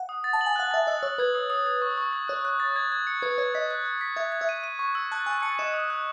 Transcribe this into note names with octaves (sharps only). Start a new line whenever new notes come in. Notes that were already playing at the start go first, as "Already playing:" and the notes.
Already playing: F#5
D#6
A6
A5
F#7
G#5
F#5 F#6
E5 A6
D#5 E6
C#5 E6
B4 G#6
D#6
D#6
G#6
C#6
C#6
G#6
C#5 F#6
F#6
A6
G#6
G#6
C#7
B4 G#6
C#5 G#6
D#5 B6
F#6
F#6
B6
E5 G#6
G#6
E5
D#7
D#7
C#6
E6
A5 F#6
G#5 F#6
A5 C#7
D#5 E7
D#6
F#6